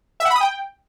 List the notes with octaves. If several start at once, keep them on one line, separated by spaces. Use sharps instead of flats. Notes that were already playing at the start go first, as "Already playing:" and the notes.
E5
F#5
B5
D#6
G5